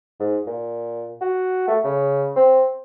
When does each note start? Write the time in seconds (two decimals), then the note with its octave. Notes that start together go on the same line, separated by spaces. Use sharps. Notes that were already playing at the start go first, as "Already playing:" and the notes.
0.20 G#2
0.47 A#2
1.21 F#4
1.68 A3
1.84 C#3
2.36 C4